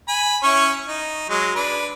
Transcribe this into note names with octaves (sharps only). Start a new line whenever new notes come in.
G#5 B5
C#4 E4 C#5
D#4
F#3 G#3
D4 B4